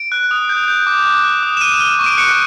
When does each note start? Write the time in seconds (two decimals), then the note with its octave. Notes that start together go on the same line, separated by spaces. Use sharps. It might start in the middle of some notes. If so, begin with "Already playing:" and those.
Already playing: D7
0.12 F#6
0.31 D#6
0.49 G6
0.68 G6
0.87 D6
1.05 F#6
1.24 F#6
1.43 D#6
1.57 E7
1.61 F6 D#7
1.80 F6
1.99 C#6
2.06 D7
2.17 F#6 C#7